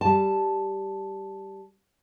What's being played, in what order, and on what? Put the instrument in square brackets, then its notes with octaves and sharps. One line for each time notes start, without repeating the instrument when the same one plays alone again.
[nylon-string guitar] G3 A5